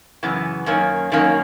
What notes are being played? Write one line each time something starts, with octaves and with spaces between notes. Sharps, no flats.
F#2 C#3 E3 B3
F#2 D#3 A#3 C#4
F#2 D#3 A#3 C#4